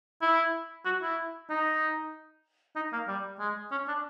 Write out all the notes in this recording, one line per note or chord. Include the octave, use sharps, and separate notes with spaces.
E4
F#4
E4
D#4
D#4
A#3
G3
G#3
C#4
D4